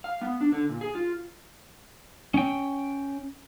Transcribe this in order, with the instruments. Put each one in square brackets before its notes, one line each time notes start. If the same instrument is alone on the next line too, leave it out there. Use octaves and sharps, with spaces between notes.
[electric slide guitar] F5
B3
D4
D3
A#2
G#4
F4
[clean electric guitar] C#4 G5